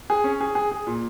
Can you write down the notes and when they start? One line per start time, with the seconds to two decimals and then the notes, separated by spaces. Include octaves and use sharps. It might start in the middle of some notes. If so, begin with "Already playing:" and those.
0.10 G#4
0.24 C#4
0.40 G#4
0.55 G#4
0.71 G#4
0.87 A#2